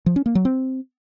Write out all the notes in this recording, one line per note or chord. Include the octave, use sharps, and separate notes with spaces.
F3
C#4
A#3
F#3
C4